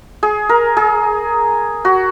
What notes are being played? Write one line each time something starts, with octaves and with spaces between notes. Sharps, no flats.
G#4
A#4
G#4
F#4